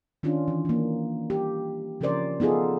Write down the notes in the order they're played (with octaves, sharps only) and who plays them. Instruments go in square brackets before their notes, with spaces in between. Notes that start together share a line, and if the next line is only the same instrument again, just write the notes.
[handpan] D#3 C#4 D4 F4
E3
E3 A#3
G4
C#3 F3 C#4 A#4 C5 D5
B3 D#4 F4 G#4 A4